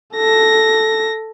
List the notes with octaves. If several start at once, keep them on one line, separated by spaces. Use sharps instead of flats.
A4 A#6